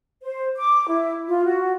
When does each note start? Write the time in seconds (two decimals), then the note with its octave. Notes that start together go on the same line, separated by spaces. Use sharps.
0.23 C5
0.57 D6
0.88 E4
1.27 F4
1.45 F#4